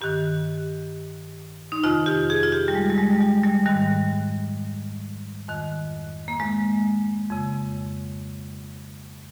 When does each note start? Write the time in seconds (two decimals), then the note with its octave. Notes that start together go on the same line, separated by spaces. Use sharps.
0.01 G2 D#3 G4
1.72 D#4
1.84 F2 C3 D#3 F4
2.06 G4
2.30 G#4
2.43 F4
2.52 G4
2.68 G3
2.75 G#3
2.90 G3
2.98 G#3
3.11 G#3
3.21 G3
3.43 G3
3.66 G#2 D#3 G3
5.48 F2 D#3
6.28 A#3
6.40 G#3
7.31 F2 C#3